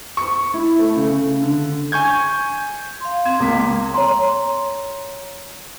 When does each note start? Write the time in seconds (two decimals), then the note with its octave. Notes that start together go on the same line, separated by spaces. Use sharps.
0.17 C#6
0.54 E4
0.79 A3
0.96 C#3
1.42 D3
1.92 G#5 C#6 G6 G#6
3.00 F5 C6
3.26 C4 G#6
3.40 C#2 A#3 B6
3.94 C#5 A#5 C6